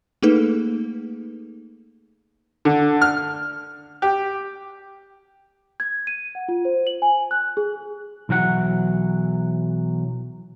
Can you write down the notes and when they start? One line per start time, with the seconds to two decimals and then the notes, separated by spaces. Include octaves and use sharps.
0.23 A3 A#3 D#4 G#4 A4 B4
2.65 D3
3.01 F6
4.02 G4
5.80 G#6
6.07 D#7
6.35 F#5
6.48 F4
6.65 C5
6.87 F#7
7.02 G#5
7.31 F#6
7.57 G#4
8.29 B1 E3 F#3 F#5